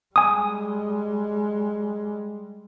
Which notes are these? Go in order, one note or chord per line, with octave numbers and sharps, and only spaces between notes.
G3 G#3 G#5 D#6